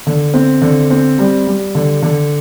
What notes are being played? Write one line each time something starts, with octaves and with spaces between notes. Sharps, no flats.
D3
C4
D3
C4
G3
G3
D3
D3